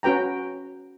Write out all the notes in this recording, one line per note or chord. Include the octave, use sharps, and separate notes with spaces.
C#4 F#4 B4 G5 A#5